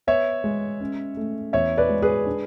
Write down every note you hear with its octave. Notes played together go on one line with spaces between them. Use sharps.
B3 C#5 E5
G#3
C#4
A3
E2 C#5 E5
B4 D5
G#3
G#4 B4
D4